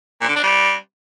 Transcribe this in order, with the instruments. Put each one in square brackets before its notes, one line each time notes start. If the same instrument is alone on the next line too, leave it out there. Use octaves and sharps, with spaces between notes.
[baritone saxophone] A#2
D3
D4
G3